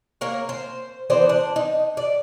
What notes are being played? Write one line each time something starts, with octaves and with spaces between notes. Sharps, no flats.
A#3 A#4 C#5
C5
E3 B3 D4 C5
D4
D#4
D5